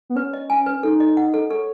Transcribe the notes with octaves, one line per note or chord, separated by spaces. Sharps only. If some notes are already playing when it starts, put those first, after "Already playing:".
B3
C#4 B4
D#5
G#5
B4
D#4 A4
D#5
F#5
A4
A4 C#5